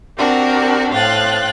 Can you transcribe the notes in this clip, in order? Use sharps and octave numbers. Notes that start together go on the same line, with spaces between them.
C4 D4 F#4 G4 A#4
A2 C5 F5 G5 F#6 A6